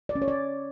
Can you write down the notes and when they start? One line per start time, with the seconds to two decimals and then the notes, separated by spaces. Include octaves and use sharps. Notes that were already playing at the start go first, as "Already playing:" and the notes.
0.09 D5
0.15 C#4
0.22 C#5
0.28 D5